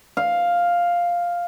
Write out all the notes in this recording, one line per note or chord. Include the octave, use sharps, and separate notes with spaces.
F5